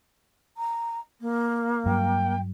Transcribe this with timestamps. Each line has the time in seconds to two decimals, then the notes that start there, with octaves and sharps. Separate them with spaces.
0.57 A#5
1.21 A#3
1.86 G2 F#3 G5